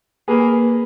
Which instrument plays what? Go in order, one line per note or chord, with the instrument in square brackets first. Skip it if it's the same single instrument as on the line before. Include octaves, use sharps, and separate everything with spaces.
[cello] A#3 [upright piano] G#4 B4